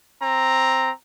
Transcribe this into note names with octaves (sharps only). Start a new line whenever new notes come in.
C4 A#5